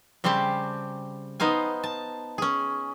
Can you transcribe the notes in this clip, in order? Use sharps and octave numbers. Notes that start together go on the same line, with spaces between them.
C#3 G3 C4 G4 C5 A5
B3 D#4 C5 F5 G#5
A5
C#4 G#4